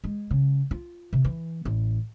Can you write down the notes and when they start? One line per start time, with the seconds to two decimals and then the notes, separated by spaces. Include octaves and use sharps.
0.04 G#3
0.31 C#3
0.71 F4
1.13 C3
1.24 E3
1.65 A1